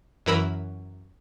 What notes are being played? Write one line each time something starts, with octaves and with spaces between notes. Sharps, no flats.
F#2 E3 A#4 B5 E6